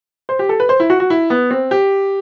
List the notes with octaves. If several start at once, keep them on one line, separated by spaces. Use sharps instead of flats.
C5
G4
A4
B4
C5
E4
F#4
F#4
E4
B3
C4
G4